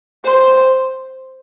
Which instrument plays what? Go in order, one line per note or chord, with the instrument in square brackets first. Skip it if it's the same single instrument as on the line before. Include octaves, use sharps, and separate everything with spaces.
[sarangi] C5